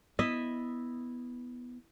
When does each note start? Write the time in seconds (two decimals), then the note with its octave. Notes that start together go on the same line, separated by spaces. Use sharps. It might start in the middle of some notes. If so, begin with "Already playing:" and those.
0.19 B3 E4 D#5 E5